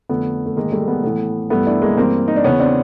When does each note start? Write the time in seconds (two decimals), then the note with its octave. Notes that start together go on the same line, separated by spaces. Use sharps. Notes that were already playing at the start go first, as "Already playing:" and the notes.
0.09 F2 D3 A3 B3
0.46 A3
0.56 G#2 D#3 G#3 A#3
0.72 G3 A3
0.88 A3 B3
1.03 A2 E3 A3 B3
1.50 G2 E3 A3 B3
1.66 D4 E4
1.82 G#3 A#3
1.97 G2 E3 A#3 C4
2.28 D#4
2.36 D4
2.44 E2 C#3 E3 B3 C#4
2.60 C4 D4